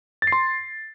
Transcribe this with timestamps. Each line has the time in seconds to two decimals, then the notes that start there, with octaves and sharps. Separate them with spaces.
0.22 A6
0.27 C7
0.32 C6